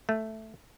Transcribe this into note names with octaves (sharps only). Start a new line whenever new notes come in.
A3